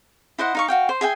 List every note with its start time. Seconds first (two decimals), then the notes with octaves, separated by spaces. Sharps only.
0.39 E4 C5 D#5 F#5
0.55 D#4 F5 C#6
0.68 F#4 F5 G5
0.89 C5
1.01 G#4 E5 G5 G#5